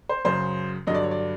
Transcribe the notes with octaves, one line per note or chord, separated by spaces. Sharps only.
C5
F#2 C#3 F#3 C5
G2 D3 F#3 D#5
D5
C#5
D5